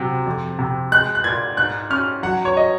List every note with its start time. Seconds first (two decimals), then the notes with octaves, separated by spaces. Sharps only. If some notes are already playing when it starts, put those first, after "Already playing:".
Already playing: C3 F#3
0.26 F2
0.59 C3
0.92 G#3 F#6
1.15 F#6
1.24 A#2 G#6
1.57 G#2 F#6
1.90 C#4 F6
2.23 F#3 F#5
2.45 C#5
2.57 D#5